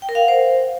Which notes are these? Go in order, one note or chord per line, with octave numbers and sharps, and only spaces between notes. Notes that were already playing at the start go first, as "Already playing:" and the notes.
G5
A#4
F5
F#5
C5